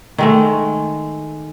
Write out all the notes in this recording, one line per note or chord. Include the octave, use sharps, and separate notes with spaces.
D#3 G#3 A3